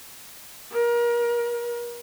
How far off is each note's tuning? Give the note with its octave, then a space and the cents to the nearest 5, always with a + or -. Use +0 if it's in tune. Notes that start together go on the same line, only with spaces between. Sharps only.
A#4 +30